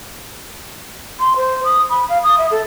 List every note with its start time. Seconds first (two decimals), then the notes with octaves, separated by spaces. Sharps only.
1.20 C6
1.37 C5
1.64 D#6
1.90 B5
2.09 F5
2.24 D#6
2.38 E5
2.51 A4